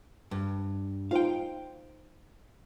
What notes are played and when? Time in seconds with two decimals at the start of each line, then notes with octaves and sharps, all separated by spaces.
0.31 G2
1.11 D#4 F4 C5 F5 G5